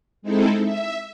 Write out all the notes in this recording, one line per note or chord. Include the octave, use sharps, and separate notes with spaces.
G#3 C4 D#4 E4 A4
E5